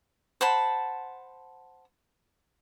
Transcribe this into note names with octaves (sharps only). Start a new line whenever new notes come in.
C5 F#5 A5 B5